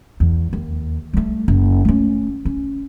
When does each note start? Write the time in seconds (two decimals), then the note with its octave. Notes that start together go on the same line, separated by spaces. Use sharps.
0.20 E2
0.53 D#2
1.13 G3 A3
1.48 F#1
1.85 A3 C#4
2.45 C#4